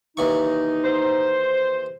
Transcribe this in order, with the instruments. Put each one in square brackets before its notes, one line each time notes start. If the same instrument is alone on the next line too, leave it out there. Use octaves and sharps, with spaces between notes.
[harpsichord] D#2 E3 C#6 [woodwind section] D#4
[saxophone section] C5